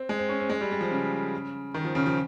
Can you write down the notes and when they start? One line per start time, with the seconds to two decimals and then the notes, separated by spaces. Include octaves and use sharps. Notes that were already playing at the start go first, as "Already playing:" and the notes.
Already playing: C4
0.09 G#3
0.19 C4
0.29 C#4
0.40 C4
0.49 G#3
0.61 G3
0.71 G3
0.81 F3
0.91 C#3
1.74 D#3
1.85 F3
1.95 C#3
2.06 F3